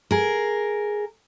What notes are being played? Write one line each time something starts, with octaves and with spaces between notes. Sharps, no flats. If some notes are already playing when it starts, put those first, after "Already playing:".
G#4 A#4